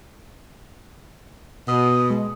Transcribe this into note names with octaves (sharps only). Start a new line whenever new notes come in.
B2 D#6
G#3